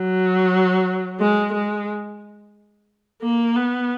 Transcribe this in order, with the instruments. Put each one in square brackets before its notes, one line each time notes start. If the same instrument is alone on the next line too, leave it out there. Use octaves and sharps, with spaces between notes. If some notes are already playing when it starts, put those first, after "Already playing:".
Already playing: [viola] F#3
G#3
G#3
A#3
B3